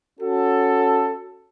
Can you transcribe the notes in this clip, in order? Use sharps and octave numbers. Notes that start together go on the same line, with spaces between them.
C#4 F#4 A4